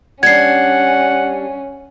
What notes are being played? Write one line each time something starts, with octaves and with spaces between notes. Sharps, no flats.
G3 C#4 D4 F#5 G#6 C7